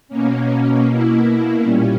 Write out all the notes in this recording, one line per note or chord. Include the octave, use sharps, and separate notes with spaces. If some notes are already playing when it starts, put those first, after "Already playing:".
B2 A#3 C#4
B2 A#3 E4
A#2 G3 C#4